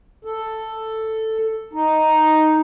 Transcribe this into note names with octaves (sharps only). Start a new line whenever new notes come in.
A4
D#4